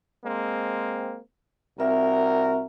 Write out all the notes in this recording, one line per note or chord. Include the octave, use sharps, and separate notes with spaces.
G#3 A#3 C4
C2 C4 F#4 A#4 E5